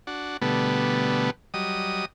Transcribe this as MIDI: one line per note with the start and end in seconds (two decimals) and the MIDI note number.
0.07 0.37 62
0.07 0.37 66
0.42 1.30 47
0.42 1.30 50
0.42 1.30 55
0.42 1.30 57
0.42 1.30 59
1.54 2.05 54
1.54 2.05 55
1.54 2.05 75
1.54 2.05 87